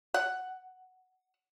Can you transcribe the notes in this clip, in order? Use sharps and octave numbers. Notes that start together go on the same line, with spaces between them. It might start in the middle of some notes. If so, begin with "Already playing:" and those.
F#5